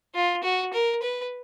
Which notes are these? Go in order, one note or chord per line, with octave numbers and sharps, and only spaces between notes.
F4
F#4
A#4
B4